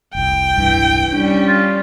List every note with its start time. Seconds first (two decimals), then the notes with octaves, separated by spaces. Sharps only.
0.15 F1 C2 G5
0.57 E1 C2 G2 E3
1.12 G3 C#4 D4
1.47 F4